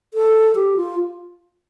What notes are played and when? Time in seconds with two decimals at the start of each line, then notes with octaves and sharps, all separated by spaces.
0.14 A4
0.55 G4
0.77 F4